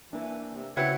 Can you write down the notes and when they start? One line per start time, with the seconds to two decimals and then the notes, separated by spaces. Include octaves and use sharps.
0.13 E3 A#3 D4
0.53 C3
0.77 C#3 C4 E4 F#4 B4 C#5